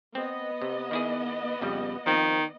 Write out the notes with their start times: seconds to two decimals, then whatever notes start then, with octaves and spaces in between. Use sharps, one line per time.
0.15 B3 C4 D#5
0.62 C3
0.91 D#3 E4 G#4
1.61 F2 C#3 G3
2.06 D#3 F3 C4